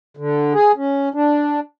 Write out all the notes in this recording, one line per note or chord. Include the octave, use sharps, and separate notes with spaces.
D3
G#4
C#4
D4